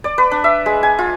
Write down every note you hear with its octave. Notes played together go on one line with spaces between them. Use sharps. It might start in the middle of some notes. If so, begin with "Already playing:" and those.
D5
B4
D4
E5
G#3
G#5
F4